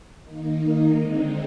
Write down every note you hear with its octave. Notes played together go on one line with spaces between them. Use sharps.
D#3 A#3 D#4
D3 G#3 C4 D#4